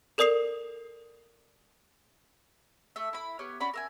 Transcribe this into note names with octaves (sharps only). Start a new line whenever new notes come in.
A4 A#4 D5 D#6 C7 F7
A3 E5
E4 B5
B3 G4 C#5 F6
C#4 F#4 D5 B5
A#4 E5 G#5